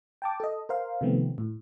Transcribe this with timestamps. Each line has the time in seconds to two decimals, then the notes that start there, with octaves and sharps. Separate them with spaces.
0.22 G5 A5 D6
0.40 A4 D#5
0.69 A#4 C5 F5
1.01 C3 D#3 F3 A3 B3 C4
1.38 A2